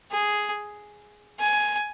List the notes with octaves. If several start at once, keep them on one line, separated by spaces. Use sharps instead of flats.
G#4
G#5